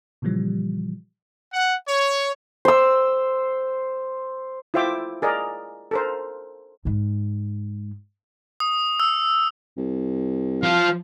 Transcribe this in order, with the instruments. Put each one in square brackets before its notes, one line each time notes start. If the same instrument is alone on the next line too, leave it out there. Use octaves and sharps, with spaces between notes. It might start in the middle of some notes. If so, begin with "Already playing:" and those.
[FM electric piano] A#2 C#3 E3 F3 G3
[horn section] F#5
C#5
[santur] C5 E6
[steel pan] E4 F4 C5 E5 G5 D6
G#4 A#4 D5 D#5
A4 A#4 C5
[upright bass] G#2 G#3
[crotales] D#6
E6
[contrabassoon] C2
[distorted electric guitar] F3 F4 [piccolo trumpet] F5